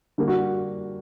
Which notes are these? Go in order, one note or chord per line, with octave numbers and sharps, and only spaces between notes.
D3 G3 A#3
F#4